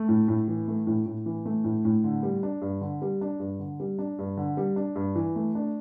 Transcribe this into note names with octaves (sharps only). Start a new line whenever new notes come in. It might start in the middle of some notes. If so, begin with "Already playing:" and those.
Already playing: A3
A2
A2
E3
A3
A2
A2
E3
A3
A2
A2
D3
G3
D4
G2
D3
G3
D4
G2
D3
G3
D4
G2
D3
G3
D4
G2
E3
A3
D4